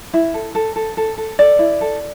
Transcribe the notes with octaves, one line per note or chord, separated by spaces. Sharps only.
E4
A4
A4
A4
A4
A4
A4 D5
E4
A4